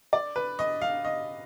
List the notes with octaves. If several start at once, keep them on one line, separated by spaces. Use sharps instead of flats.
D5
B4
D#5
F5
D#5